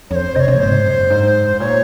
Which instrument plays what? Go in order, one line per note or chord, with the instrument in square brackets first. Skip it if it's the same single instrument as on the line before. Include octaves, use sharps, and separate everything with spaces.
[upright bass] F2 [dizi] C5 C#5
[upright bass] C3 [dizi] D#5
[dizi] C#5
[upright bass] C3
A#2
[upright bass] G#2 [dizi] C5
[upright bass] F#2
G#2
G#2
[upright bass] A#2 [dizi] C#5